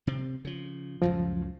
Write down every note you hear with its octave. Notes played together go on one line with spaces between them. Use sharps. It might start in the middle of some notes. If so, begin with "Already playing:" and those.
C3 C4
C#3 F3
C#2 F#2 A2 F3